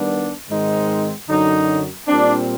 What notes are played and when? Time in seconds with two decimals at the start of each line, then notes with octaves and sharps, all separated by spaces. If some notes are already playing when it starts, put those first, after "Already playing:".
Already playing: D#3 G3 B3 D4
0.49 G#2 D#3 G#3 C4 D#4
1.27 F#2 D3 F#3 D#4
2.07 A#2 G3 C4 D4